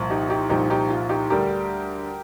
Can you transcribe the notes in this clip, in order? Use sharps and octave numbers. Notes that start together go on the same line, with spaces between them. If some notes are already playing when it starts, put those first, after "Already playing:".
Already playing: C2 A#2 F3
D#4 G4
D#4 G4
C2 A#2 F3 D#4 G4
D#4 G4
F4
D#4 G4
D2 D3 G3 G4 A#4